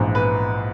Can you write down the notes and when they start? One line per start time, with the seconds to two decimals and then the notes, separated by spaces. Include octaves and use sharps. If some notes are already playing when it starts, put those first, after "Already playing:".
Already playing: A#1 G#2 E3
0.15 B4